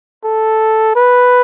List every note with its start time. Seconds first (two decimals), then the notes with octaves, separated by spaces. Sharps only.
0.25 A4
0.96 B4